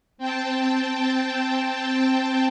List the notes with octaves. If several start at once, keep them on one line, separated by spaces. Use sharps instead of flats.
C4 G5 A5